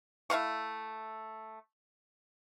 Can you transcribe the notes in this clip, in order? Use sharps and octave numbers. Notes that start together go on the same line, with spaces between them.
A3 E4 F5 C#6